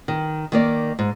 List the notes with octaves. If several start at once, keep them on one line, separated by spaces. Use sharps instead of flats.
D#3
D#3 A#3 D5
G#2